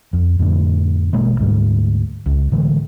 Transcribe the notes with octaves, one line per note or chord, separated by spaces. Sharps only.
F2
F2 A2 D3
A1 B2 G#3 A#3
D2 G#2 G3
C#2
A2 D3 E3 G#3